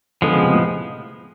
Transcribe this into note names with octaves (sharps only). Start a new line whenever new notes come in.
D3 F3 G#3 B3
C#3
C3
A2